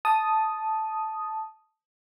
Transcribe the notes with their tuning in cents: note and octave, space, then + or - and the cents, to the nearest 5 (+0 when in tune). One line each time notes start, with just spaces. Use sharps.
A5 -5 D#6 +0